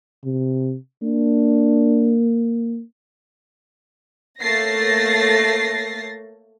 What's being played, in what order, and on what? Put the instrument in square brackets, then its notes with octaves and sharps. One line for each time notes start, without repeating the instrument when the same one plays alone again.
[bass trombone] C3
[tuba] A#3 [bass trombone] D4
[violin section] A3 A#3 C#5 A6 A#6 C7